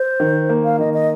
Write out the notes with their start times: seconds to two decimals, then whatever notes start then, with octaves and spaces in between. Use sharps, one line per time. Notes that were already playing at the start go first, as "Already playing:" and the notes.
Already playing: C5
0.20 D#3
0.49 A#3
0.64 F5
0.79 D#3 D#5
0.94 D#5